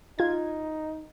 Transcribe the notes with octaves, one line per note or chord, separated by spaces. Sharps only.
D#4 F4 G#6